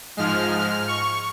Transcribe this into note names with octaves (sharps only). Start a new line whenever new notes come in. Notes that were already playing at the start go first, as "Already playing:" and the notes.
G#2 F3 G#3 F6
F6
C#6